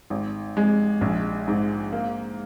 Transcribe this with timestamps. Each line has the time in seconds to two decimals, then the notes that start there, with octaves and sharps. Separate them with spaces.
0.10 G#1
0.57 G#3
1.01 A#1
1.48 G#2
1.92 A#3